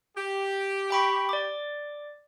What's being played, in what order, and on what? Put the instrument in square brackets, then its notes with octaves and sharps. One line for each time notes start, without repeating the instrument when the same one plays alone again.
[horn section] G4
[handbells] G5 B5 C#6
D5 D6